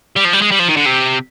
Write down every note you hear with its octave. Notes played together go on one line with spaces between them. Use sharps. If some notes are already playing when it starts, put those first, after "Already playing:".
G3
F3
G3
G#3
G3
F3
D#3
D3
C3